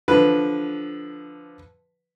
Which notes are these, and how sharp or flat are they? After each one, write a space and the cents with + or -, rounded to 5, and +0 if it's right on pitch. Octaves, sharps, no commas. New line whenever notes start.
D3 +0 F3 +0 B4 +0